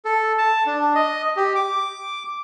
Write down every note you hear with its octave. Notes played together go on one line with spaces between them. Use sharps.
A4
A5
D4
D#5
G4
D6